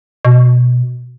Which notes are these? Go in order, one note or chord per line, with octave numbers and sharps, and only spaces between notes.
B2